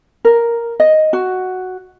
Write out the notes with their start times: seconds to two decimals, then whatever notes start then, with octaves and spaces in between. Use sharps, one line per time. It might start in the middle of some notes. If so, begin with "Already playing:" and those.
0.25 A#4
0.80 D#5
1.13 F#4